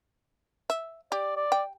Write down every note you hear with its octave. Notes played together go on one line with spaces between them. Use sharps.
E5
G4 D5
D5
G5